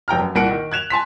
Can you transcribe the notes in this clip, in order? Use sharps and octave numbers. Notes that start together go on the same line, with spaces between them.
F1 G5 A#5 F6
F#2
C2 A#2 A#4 F#5 D7
D#3
F#6 G#6 E7 F7
G#5 A5 C6 B6